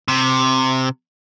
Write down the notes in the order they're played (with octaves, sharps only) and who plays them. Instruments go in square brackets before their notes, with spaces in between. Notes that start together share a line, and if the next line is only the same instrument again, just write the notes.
[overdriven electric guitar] C3